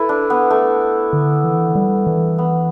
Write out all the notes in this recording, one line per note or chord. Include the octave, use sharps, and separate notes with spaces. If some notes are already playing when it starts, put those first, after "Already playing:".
Already playing: E4 A4 B4
D4
B3
A3
D3
E3
G3
E3
B3